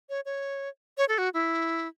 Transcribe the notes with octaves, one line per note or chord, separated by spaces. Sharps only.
C#5
C#5
C#5
A4
F#4
E4